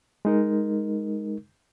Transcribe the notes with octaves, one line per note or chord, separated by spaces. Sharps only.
G#3 D#4 A#4